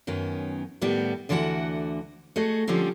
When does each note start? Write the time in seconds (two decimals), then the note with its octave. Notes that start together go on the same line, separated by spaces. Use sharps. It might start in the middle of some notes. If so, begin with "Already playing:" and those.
0.07 F#2 D#3 B3 C#4
0.81 A2 D#3 G3 B3
1.29 D2 D3 E3 F#4 C5 F#5
2.36 A3 F#4 G#4 D#5
2.68 D3 F3 G3 C4 C#4